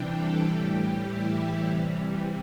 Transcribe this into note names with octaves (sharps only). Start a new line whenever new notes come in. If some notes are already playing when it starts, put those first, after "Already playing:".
Already playing: C3 E3 G3 D4 G4
A4
A2 E3 G3 G4
E4
C3 E3 G3